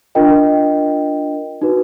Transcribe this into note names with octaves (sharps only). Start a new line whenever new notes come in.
D4 F4 A#4 D#5 G5
D#4 F#4 B4